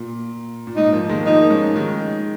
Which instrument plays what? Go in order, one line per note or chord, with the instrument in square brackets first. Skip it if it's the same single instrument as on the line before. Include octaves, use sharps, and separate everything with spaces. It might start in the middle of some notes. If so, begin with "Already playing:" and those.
Already playing: [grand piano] A#2
A#2
[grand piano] G#2 [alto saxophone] D#4
[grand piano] F3 A#3
D#3 G#3
[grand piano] F3 A#3 [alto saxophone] D#4
[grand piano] G#3 C#4
D#3 G#3